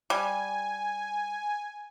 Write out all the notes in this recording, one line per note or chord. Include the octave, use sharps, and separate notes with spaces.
G3 G#5